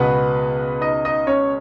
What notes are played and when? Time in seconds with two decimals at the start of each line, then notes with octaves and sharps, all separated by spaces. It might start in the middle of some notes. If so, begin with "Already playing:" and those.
Already playing: C#2 B2 B3 B4
0.81 D#4 D#5
1.05 D#4 D#5
1.27 C#4 C#5